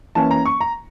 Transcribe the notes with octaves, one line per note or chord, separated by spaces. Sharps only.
E3 A#3 C#4 A5
A#5
C#6
A#5